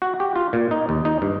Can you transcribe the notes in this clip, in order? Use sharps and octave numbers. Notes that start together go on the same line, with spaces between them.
F#4
G4
F4
A#2
D#4
D#2
D#4
G2